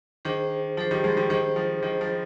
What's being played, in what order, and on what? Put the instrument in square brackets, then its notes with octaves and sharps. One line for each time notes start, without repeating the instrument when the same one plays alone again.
[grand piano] D#3 [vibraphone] D4 G#4 C5
[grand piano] F3 [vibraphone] D4 G#4 C5
[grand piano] D#3 G3
F3 G#3
D#3 G3
[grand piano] D#3 G3 [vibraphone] D4 G#4 C5
[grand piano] F3
[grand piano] D#3 [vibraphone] D4 G#4 C5
[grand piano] F3